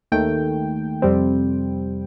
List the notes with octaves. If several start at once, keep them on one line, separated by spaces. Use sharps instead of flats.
D#2 D#3 A3 G5
F2 C3 G3 C4